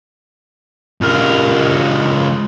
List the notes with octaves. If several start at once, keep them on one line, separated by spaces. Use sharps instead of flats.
C#2 A#4